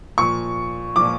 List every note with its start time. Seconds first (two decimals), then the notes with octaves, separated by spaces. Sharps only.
0.18 A#2 F3 C#6
0.96 A#2 F3 D6